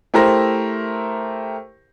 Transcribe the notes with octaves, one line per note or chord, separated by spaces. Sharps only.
A3 E4 G4 A#4 C5 A#6